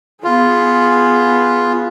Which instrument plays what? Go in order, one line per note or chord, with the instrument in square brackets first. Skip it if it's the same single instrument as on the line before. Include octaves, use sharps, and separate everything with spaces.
[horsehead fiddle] B3 G#4 [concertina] F4